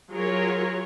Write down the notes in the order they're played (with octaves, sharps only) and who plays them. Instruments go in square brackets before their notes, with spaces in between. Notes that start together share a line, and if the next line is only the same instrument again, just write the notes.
[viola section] F#3 F4 G#4 A#4 C#5